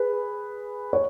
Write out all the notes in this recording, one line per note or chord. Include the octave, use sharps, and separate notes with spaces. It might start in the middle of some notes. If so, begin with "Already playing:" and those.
Already playing: G#4 B4
C#5